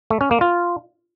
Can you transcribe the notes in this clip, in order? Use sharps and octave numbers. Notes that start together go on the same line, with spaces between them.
A3
C#4
A#3
F4